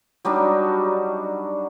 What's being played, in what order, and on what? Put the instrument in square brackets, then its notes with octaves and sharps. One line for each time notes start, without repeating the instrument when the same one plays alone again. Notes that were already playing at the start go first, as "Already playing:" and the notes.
[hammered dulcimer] F#3 G3 D4 D#4